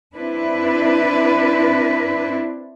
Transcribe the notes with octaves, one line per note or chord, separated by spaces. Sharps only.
C4 D4 E4 B4